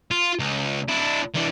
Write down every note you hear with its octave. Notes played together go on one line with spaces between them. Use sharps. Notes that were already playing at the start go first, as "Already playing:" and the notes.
F4
C#2
D4 E4
E3 D4